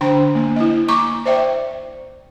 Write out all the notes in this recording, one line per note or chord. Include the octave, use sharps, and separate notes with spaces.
D3 D4 C5 G5 A#5 C6
A#3
E4 D#5
A#3 A#5 C#6 D6
C5 D5 E5 G5